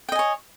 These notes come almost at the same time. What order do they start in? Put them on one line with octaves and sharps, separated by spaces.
G5 D#5 G#5 C#5